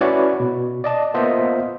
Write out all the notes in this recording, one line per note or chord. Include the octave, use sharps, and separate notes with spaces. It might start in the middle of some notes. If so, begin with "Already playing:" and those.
C#4 E4 F#4 B4 C#5 D5
B2
D5 D#5 A5
A#3 B3 F4 C5 D#5 E5